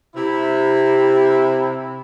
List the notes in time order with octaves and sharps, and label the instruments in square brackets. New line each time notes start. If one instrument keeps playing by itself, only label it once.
[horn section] C3 E4